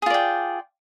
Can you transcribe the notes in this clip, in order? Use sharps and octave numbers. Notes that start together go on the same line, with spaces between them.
F4 G#4 D5 G5